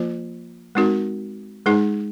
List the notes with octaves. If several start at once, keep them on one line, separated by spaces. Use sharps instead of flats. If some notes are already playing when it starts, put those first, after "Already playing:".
Already playing: F3 A#3 F4 C5
G#3 C4 D#4 F#4 A#4
G#3 D#4 G#4